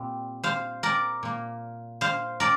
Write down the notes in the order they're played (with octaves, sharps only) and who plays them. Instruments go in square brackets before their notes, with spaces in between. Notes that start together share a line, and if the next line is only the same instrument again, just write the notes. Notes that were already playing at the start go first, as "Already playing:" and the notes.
Already playing: [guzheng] A#2 G3 C4
C5 F5
A#4 D5
A#2 A#3
C5 F5
A#4 D5